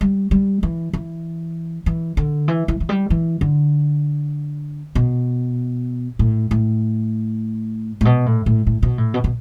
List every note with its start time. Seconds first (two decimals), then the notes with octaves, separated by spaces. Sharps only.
0.01 G3
0.31 G3
0.63 E3
0.93 E3
1.86 E3
2.17 D3
2.48 E3
2.68 E3
2.80 E3
2.89 G3
3.10 E3
3.41 D3
4.95 B2
6.19 A2
6.51 A2
8.01 A2
8.05 B2
8.26 A2
8.46 A2
8.67 A2
8.83 B2
8.98 A2
9.14 B2
9.24 B2